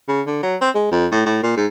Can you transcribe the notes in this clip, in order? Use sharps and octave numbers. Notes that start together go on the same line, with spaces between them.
C#3
D3
F#3
C4
G#3
F2
A2
A2
A#2
G#2